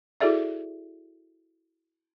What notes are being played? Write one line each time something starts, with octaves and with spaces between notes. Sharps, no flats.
E4 F#4 G#4 A4 D5 E5